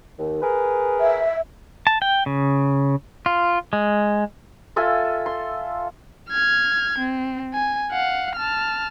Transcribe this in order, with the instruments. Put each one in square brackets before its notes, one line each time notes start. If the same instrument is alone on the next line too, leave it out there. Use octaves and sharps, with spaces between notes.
[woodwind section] D#2
G#4 A#4 B4
[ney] E5
[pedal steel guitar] A5
G5
C#3
F4
G#3
[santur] F4 A4 E5 G#5
C6
[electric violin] F6 G#6
C4
G#5
F5 F#5
A5 F6